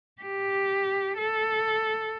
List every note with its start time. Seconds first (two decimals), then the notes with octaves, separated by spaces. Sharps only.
0.22 G4
1.18 A4